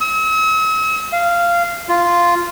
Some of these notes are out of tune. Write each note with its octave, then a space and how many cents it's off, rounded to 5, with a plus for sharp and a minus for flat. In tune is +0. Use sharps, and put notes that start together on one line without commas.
E6 -45
F5 -15
F4 -5